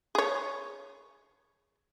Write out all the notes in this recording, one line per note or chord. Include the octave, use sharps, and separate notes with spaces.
G#4 C#5